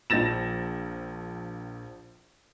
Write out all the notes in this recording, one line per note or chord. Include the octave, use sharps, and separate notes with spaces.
A#1 F3 A6 A#6 E7